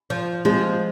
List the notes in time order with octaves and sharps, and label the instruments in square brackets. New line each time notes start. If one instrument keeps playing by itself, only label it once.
[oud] F3
[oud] F3 [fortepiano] G#3